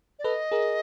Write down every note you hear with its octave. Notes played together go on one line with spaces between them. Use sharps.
D5
A4 B4 D#5
G#4 A#4